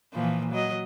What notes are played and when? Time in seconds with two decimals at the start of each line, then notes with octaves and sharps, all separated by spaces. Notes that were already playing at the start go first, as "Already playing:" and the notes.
0.13 A#2 E3 F3
0.51 F#3 D#5